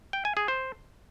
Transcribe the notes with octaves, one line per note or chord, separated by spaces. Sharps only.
G5
G#5
G#4
C5